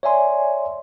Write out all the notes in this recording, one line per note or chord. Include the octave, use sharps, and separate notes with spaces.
C#5 D5 E5 G#5 C6